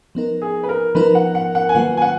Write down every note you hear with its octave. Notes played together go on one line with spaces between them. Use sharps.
F3 B3 D#4 A#4
G#4
B4
A#4
F3 B3 D#4 A#4 B4
F#5
F#5
F#5
G#5
D#3 F#3 A#3 F4 B4 F#5
G#5
F#5